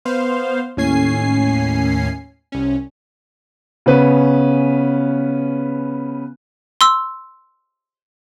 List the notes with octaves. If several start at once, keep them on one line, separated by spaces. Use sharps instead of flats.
B3 C5 F5
D#2 A2 C#4 G#5 C7
C2 C#4
C#3 B3 C#4 B4
C6 E6